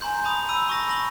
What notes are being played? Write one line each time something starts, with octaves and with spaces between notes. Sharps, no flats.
G#5 A#5 C6 G6
A5 B5 D#6
B5 E6 D#7
B5 C#6 D#6 A#6
D#6 A#6 F#7